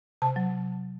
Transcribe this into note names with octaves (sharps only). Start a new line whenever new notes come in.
C3 A5
F#3